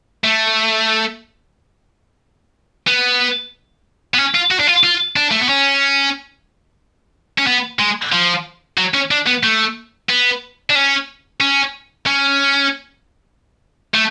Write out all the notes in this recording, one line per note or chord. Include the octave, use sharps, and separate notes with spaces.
A3
B3
B3
C#4
F4
F#4
D4
F4
F4
D4
A3
B3
C#4
C#4
B3
G#3
F3
F#3
C#4
D4
B3
A3
B3
D4
C#4
C#4
C#4
A3